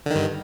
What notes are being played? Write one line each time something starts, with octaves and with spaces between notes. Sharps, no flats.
G2 D3 D#3